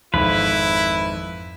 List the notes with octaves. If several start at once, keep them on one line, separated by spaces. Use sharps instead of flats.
G#1 F2 E4 B4